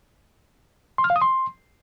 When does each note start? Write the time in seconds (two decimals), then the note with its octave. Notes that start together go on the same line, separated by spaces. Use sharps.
0.98 C6
1.04 F6
1.10 F5
1.16 D#6
1.22 C6